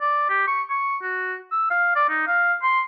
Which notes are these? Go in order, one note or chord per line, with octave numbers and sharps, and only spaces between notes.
D5
G4
C#6
C#6
F#4
E6
F5
D5
D#4
F5
C6